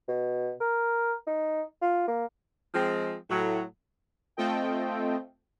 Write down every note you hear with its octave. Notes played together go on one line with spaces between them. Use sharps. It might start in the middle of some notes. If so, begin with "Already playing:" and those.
B2
A#4
D#4
F4
A#3
F3 G#3 C4
A2 F#3
A3 C4 F4 A4 D#5 G5